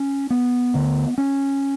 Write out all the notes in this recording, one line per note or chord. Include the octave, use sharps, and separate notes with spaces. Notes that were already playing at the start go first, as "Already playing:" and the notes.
Already playing: C#4
B3
D2 D3
C#4